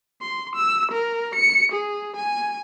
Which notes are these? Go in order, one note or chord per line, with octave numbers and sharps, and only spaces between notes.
C6
E6
A#4
C#7
G#4
G#5